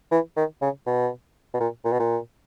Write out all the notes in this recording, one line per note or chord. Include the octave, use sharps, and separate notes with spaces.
E3
D#3
C#3
B2
B2
A#2
A#2
B2
A#2